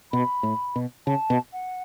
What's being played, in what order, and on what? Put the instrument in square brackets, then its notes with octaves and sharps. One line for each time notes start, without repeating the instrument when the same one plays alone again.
[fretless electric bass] B2 [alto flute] B5
[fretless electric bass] A2
B2
[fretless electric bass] C#3 [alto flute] A5
[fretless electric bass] B2
[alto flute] F#5